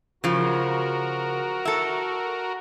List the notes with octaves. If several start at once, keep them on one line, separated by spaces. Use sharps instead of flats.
C#3 F3 F#4 A#4
A4 E5